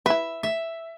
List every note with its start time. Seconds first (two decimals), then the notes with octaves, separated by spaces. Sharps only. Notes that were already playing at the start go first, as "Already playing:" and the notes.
0.06 E4 B4 E5
0.43 E5